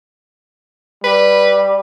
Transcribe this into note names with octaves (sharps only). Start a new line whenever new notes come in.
G3 B4